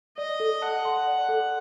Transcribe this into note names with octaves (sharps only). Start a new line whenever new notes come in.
D5 D#5
A4
F#5 A5
C6
D5
A4